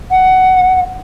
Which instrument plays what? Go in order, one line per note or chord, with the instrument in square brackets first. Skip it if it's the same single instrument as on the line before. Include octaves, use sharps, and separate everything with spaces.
[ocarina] F#5